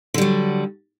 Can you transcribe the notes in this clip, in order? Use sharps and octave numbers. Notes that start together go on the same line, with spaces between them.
D3 F#3 G3